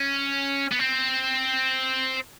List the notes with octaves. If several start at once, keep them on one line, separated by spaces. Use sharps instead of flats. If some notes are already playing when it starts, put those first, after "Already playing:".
Already playing: C#4
B3
C4